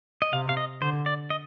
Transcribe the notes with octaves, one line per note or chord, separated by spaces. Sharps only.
D#5
C3 F5
F5
D#5
D3 C5
D5
D#5